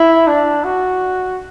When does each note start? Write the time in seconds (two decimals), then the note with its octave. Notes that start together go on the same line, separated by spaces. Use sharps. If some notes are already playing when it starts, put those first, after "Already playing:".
Already playing: E4
0.27 D4
0.64 F#4